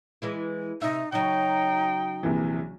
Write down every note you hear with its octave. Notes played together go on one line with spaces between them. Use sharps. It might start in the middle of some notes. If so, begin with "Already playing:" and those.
E3 G#3 E4
C3 D#4 E5
C#3 F#3 D#4 G5
A#1 C3 E3